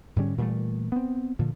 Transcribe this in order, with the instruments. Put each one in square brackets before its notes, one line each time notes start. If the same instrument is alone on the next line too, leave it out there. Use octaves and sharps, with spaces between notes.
[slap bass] G#2 D3 G3 C#4
A#2 E3 G3 A3
B3 C4
A#2 D3 F3